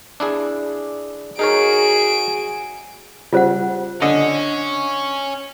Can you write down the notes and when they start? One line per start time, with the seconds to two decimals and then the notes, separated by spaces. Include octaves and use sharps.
0.20 D4 E4 G#4
1.39 D#4 F#4 G#4 A#4 C#5 G#5 D7
3.33 C#3 G3 F4 C5 F#5
4.02 D3 C#4 D#5